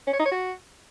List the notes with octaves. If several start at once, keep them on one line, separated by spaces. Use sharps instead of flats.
C#4
C#5
D#4
C#5
F#4